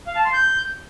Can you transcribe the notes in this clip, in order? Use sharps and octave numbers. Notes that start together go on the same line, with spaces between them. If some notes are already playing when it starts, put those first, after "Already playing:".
F5
A5
C6
G6